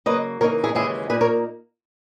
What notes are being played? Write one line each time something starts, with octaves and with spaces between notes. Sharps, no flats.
C#3 F#3 A#3 B4 D#5
C#3 E3 A#3 D#4 A#4 C#5
E4 G#4
D#2 C#3 E3 G#3 E4 G#4
A#2 A#3 D#4 G#4 B4
A#4 C#5